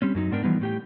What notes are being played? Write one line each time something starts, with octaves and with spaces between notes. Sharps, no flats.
G3 C4 C#4
F#2 F#3 D#4
G#2 B3 D4 A#4 G5
E3 F3 G3 B3 D#4
A2 G4 G5